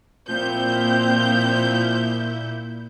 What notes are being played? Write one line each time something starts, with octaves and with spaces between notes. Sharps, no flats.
A#2 F3 C4 E4 G6